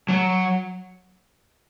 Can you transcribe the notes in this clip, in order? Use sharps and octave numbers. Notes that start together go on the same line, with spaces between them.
F#3